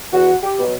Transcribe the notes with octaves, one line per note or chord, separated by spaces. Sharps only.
E2 F#4
G4
B2 F#3